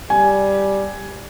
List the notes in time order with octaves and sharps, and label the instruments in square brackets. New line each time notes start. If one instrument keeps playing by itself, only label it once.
[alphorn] G3 [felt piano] G#5